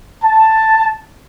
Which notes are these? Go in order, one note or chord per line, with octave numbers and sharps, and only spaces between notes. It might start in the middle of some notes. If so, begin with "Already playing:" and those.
A5